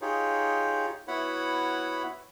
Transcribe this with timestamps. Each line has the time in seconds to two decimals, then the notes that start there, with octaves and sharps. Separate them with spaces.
0.01 D#4 F4 G4 G#4 C#5
1.08 B3 E4 F#4 C#5 F#5 B5